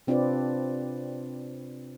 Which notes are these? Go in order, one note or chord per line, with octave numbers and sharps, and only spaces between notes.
C3 C4 D4 F4 B4 D5